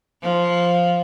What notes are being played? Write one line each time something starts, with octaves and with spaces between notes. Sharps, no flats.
F3